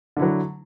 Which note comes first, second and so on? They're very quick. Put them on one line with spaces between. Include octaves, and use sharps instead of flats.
D3 E4 F#3